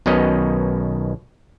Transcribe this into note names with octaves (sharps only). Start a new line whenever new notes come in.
B1 B2 D#3 C#4 D#5